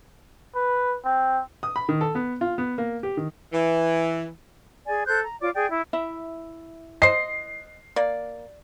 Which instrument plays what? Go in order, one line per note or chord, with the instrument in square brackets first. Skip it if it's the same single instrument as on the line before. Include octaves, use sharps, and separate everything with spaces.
[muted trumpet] B4
C4
[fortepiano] D#6
B5
D#3
A4
B3
F4
B3
A#3
G4
D#3
[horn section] E3
[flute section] G#4 D5 G#5
A4 C5 F#6 G6
A#5
F4 C#5 D5 D6
G#4 D5 G5
E4
[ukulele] E4 E5
[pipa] C5 D#5 [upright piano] C7
[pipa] A#3 [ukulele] D5